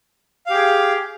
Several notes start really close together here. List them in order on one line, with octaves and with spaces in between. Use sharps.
F5 G4 G#4